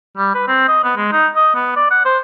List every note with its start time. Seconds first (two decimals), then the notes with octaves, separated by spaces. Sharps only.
0.17 G3
0.34 B4
0.48 C4
0.68 D#5
0.84 B3
0.97 G#3
1.12 D#4
1.36 D#5
1.55 B3
1.76 D5
1.91 F#5
2.05 C5